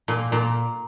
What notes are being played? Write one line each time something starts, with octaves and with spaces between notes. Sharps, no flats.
A#2
A#2